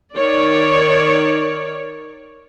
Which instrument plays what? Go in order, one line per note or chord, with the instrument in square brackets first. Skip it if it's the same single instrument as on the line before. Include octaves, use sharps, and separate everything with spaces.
[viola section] D#3 C#5 D5